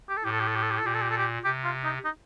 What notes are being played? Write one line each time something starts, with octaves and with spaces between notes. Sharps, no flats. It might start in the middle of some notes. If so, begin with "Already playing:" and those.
G4
A4
A2 G4
A4
G4
A4
G4
A4
G4
A4
A#2 G4
A4
G4
A4
G4
C3 G4
F4
D#4
D#4